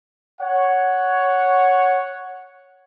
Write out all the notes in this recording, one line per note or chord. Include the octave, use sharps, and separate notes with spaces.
C#5 F#5